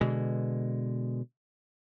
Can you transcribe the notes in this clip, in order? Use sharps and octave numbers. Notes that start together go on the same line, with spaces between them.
B2 D3 G#3